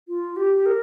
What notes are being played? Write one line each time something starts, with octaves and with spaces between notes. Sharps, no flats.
F4
G4
A#4